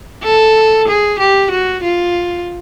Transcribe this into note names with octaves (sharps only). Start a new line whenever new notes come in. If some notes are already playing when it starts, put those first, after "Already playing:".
A4
G#4
G4
F#4
F4